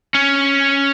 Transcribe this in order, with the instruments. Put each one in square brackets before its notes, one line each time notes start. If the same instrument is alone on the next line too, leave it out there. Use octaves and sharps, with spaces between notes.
[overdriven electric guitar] C#4